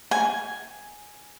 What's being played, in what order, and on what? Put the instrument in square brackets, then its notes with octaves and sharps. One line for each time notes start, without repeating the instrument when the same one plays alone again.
[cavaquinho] G#5